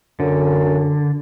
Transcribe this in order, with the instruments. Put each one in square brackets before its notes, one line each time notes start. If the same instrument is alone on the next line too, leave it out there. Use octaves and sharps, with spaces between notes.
[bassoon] F#2 [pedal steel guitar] D3